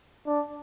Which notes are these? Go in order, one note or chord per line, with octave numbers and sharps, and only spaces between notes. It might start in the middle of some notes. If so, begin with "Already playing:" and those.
D4